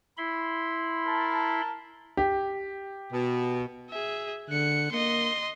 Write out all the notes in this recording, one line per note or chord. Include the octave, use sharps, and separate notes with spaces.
E4 B5 C6
A#4 A5
G4
B2
G#4 E5
D3 F#6 C#7
A#3 D#5 C6